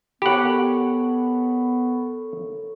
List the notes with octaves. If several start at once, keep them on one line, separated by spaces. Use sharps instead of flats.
B3 G4 A4 A#4 C#5 F#5 B5